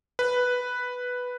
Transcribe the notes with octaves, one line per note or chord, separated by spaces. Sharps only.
B4